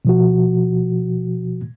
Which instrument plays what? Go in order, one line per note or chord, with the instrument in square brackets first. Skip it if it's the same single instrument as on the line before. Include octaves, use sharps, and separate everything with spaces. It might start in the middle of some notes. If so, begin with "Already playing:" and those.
[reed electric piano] B2 F3 F#4